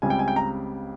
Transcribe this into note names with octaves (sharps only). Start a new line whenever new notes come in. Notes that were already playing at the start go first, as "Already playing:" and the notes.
C#2 C#3 G3 C4 G#5
G5
G#5
G5
A#5